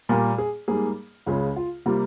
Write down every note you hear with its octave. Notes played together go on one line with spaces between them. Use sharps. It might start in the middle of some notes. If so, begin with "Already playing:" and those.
A#2 G3 A#3 A#4
G#4
G#2 G3 A#3 G#4
C#2 C#3 G#3 F4
F4
C3 G3 A#3 F4